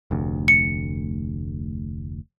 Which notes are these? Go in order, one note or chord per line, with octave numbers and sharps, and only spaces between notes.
F1 D2
C#7